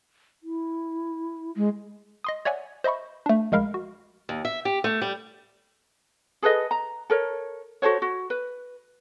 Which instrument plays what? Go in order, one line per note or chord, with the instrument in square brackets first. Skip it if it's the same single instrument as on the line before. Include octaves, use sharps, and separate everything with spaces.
[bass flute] E4
[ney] G#3
[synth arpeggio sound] D#5 C6 D#6
C#5 D5 E5 F#5 G#5
C5 D#5 E5 B5 C#6
A3 D4
A#1 G#3 A#4 F5 B5 F6
F#4
[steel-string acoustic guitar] D#2
E5
G4
A3
G3
[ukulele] G#4 A4 B4 D#5
A#5
A4 A#4 C#5
F#4 A4 C5 C#5
F#4
B4